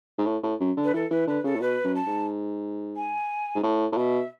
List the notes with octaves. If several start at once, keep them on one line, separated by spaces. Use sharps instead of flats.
G#2
A2
A2
F#2
D3
B4
E3 A4
E3 B4
D3 B4
C#3 A4
A2
B2 B4
F#2
A5
G#2
G#5
G#2
A2
A2
B2 E5